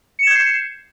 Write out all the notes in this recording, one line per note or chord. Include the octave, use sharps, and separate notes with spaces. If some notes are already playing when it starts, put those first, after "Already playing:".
G6 G#6 C7 C#7 E7